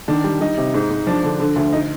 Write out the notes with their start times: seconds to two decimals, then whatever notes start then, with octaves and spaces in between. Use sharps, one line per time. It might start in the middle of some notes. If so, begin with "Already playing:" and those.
0.08 D#3 D4
0.24 G3
0.41 G3 D#4
0.57 C3
0.74 G#2 D#4
0.90 G#2
1.07 F3 D4
1.24 D3
1.40 D3
1.56 D2
1.73 D#4